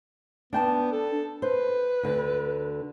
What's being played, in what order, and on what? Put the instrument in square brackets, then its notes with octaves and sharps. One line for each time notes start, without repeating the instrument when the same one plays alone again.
[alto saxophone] B3 [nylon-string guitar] D4 G5 A5
[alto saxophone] A4
[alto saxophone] B4 [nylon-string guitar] C5
[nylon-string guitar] D2 D3